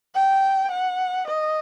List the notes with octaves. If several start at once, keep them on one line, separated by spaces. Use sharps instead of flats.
G5
F#5
D#5